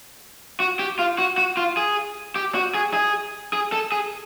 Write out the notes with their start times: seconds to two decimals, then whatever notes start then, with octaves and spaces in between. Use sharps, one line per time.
0.60 F#4
0.79 G4
0.99 F4
1.18 F#4
1.38 F#4
1.57 F4
1.77 G#4
2.36 G4
2.55 F#4
2.75 G#4
2.94 G#4
3.53 G#4
3.72 A4
3.92 G#4